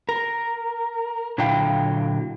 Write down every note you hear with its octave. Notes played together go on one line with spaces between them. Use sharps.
A#4
A#2 D3 F#3 E4 F5 G5